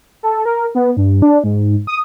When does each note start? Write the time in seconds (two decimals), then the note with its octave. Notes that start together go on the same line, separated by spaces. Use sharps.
0.23 A4
0.45 A#4
0.75 B3
0.97 G2
1.22 D4
1.44 G#2
1.87 D#6